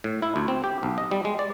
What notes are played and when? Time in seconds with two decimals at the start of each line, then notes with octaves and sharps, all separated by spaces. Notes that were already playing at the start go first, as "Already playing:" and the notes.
0.04 A2
0.22 E4
0.36 D2
0.48 C4
0.64 G4
0.83 B1
0.98 D#5
1.11 G3
1.25 G#3
1.39 D5